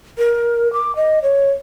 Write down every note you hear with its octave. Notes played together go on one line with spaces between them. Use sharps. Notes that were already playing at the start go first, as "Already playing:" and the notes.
A#4
D6
D#5
C#5